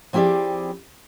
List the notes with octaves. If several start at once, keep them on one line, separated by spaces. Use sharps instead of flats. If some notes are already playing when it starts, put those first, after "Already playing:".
F3 C4 E4 G4 G#4 D5